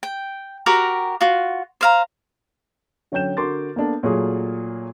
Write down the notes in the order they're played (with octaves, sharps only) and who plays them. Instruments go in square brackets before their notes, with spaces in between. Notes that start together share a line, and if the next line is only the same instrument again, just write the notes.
[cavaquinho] G5
F#4 G4 A#4 A#5
F4 F#4
C5 F5 A#5
[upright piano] D3 F#3 C#4 G5 G6 E7
D3 F#4 A#4 C6 D6 A6
A#3 B3 D4 A4
A#2 F#3 A3 F4 F#4 G#4